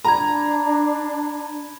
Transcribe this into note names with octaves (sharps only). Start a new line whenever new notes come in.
D4 A#5 B5 G#6